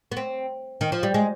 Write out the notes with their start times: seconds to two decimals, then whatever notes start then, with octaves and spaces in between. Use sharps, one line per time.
0.12 B3
0.17 C4
0.81 D#3
0.92 F3
1.03 G3
1.14 G#3